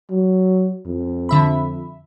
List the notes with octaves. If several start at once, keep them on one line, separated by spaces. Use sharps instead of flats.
F#3
F2
D3 E5 B5